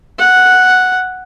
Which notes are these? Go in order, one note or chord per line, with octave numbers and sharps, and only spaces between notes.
F#5